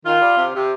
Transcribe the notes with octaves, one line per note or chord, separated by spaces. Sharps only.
D#3 F4
G3
C3
C3